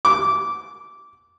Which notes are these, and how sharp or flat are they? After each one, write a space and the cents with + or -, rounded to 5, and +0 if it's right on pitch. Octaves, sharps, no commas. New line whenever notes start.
D6 -15